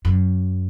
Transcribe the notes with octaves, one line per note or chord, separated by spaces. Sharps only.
F#2